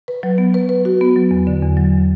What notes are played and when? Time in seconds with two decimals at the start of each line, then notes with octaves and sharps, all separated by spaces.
0.08 B4
0.23 F#3
0.38 B3
0.54 B4
0.69 B4
0.85 F#4
1.01 B3
1.16 F#3
1.31 E2
1.47 D3
1.62 E2
1.77 F#3